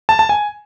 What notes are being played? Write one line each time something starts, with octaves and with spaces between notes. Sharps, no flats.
A5
A5
G#5